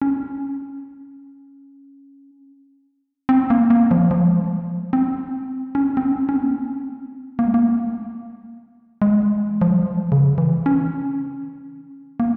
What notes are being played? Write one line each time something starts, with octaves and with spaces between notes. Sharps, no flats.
C#4
C4
A#3
A#3
F3
F3
G#3
G3
A#3
G#3
C4
C#4
C4
C#4
C#4
C4
A#3
C4
A#3
G#3
A#3
G#3
E3
F3
G3
G#3
C#3
E3
C#4
A#3